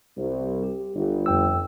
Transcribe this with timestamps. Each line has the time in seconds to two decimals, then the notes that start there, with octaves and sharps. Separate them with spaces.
0.17 C2
0.63 G4
0.96 G1
1.26 F2 G5 E6